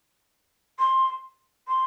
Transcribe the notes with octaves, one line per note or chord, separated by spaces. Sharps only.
C6
C6